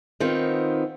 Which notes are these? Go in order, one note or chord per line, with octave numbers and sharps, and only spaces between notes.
D#3 B3 C4 F4